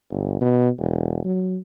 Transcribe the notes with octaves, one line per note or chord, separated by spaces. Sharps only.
G1
B2
E1
F#3